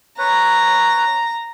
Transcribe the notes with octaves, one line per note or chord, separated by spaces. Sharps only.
B4 C#5 A#5